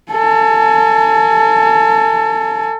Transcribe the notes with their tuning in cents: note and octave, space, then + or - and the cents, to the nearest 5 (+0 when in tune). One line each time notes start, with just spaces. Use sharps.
A4 +30 G#5 +45